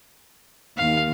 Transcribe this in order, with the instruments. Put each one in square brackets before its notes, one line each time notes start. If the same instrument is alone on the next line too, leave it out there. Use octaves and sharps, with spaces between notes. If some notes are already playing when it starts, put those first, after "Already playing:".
[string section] D#2 [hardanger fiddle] F5